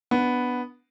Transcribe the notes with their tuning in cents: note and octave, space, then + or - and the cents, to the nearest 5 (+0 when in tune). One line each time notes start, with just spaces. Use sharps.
B3 +0 D4 +0